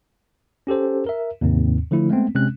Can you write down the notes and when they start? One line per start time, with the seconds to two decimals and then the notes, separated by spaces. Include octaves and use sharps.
0.67 C#4 G4 A4 C5
1.07 A#4 E5
1.41 D#2 G#2 C3 C4
1.91 D3 F3 A3 E4
2.09 G#3 A3 B3 C4
2.35 C3 G#3 C4 C#4 F#6